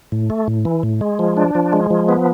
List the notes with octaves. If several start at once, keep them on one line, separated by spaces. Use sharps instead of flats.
A2
A3
A2
E3
A2
G#3
F3
D4
F3
G#3
F3
B3